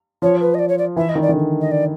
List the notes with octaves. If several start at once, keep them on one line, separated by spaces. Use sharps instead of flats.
F3 C#5
B4
D#5
D5
C#5
D5
E3 E5
D#5
D#3
D5
D#3
D3
D#5
D5